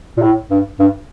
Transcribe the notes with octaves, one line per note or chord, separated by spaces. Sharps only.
A#2
A2
G2
G2